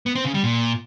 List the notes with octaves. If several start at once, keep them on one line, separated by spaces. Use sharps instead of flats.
B3
C4
C#3
G3
A#2